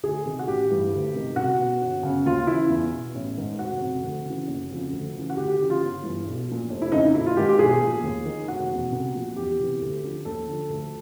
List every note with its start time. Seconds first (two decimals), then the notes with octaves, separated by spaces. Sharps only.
0.03 D2 G#4
0.25 C3 D#3
0.39 F#4
0.47 A1 G4
0.70 G2 E3
0.92 D2
1.14 C3 D#3
1.36 C2 F#4
1.59 B2
1.82 G1
2.03 F#2 C#3
2.25 D#2 F4
2.47 C#3 E3 E4
2.70 E2
2.92 B2
3.15 A1
3.37 G#2 D#3
3.59 F1 F#4
3.81 F2 C3
4.03 D2
4.25 C#3 E3
4.48 F#1
4.71 F2 C#3 F3
4.92 D2
5.14 C#3
5.19 E3
5.30 F#4
5.37 D2 G4
5.48 G4
5.59 C#3 E3 G4
5.70 F4
5.82 G1
6.04 G2 E3
6.26 B1
6.48 A#2 F3
6.70 F1
6.82 E4
6.92 F2 C#3 D#4
7.14 A#1 E4
7.26 F4
7.37 G#2 D#3 G4
7.49 G4
7.59 B1 G#4
7.81 A#2 F3
8.03 D#2
8.25 D#3
8.48 F1 F#4
8.71 E2 B2
8.92 C2
9.15 A#2 F3
9.36 E2 G4
9.59 C3 E3
9.82 D2
10.04 D3 F3
10.25 D#2 A4
10.48 D3 F3
10.70 D2